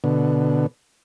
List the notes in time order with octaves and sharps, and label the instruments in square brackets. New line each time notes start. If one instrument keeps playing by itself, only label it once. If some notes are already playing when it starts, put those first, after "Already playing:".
[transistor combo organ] B2 D3